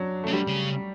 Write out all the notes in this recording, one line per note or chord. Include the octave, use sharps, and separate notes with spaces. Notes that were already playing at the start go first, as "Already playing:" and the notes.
Already playing: F#3 D4
C#3 A3
D3 G3
C#3